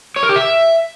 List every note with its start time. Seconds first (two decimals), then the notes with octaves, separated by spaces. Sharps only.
0.16 C#5
0.23 A#4
0.29 G4
0.36 E5